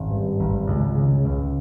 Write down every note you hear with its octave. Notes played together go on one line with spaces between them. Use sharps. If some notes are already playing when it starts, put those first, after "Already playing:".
Already playing: G#1 C#4
G2
G#1
C#2
C#3
C#2